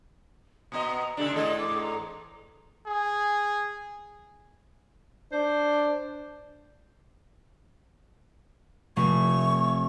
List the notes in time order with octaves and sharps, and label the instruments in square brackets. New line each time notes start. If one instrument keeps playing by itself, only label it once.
[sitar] A#2 B3 D#5 [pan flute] A#5
[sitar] C#3 A3 D4 [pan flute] G4
[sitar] E2 G#2 A4 [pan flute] D#5
[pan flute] D6
A#5
[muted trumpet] G#4
[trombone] D4 [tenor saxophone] C5
[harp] F1 A3 [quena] C#6